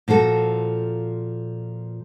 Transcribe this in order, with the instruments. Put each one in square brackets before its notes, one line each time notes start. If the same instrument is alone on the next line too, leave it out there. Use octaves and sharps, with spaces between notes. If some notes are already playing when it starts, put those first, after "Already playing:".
[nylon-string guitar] A#2 F3 F#4 A4